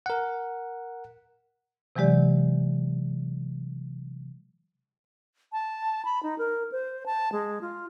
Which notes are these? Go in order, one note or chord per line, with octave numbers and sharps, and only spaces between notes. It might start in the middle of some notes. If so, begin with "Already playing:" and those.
A#4 F#5
C3 E3 F#3 G#3 G4 D5
A5
B5
D#4
A#4
C5
A5
G#3
F4